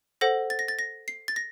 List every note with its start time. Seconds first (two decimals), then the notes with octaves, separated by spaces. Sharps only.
0.21 A4 C5 F#5 A#6
0.50 A6
0.59 A#6
0.68 A6
0.79 A#6
1.08 C7
1.28 A6
1.36 A#6